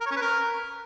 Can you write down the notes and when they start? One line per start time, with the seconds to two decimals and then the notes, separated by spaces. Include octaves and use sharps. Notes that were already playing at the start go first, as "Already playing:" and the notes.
0.01 A#4
0.06 C#5
0.11 C#4
0.17 B4
0.22 A#4